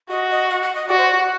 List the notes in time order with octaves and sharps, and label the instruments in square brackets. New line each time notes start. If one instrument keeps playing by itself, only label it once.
[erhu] F#4 [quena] D#5
[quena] D#5
F#5
F#5
D#5
[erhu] F#4 [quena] D5
[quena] C5
D5
F#5